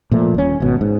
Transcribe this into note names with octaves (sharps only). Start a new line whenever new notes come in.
A#2 F3 A3
D#1 C#4
G#1 B2
G#2